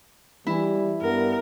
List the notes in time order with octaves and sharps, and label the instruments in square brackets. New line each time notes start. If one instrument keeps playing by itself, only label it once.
[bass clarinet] E3 [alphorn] G3 [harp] E4
[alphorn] G2 [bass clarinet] B3 [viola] A#4